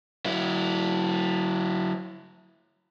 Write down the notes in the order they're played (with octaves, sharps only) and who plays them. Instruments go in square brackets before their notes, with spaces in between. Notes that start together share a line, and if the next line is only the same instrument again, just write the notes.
[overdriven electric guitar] F#3 E4